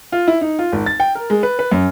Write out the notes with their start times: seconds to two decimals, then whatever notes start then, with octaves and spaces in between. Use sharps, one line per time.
0.12 F4
0.28 E4
0.41 D#4
0.59 F4
0.72 G#1
0.86 A6
1.00 G5
1.15 A#4
1.30 G#3
1.43 B4
1.59 B4
1.71 F#2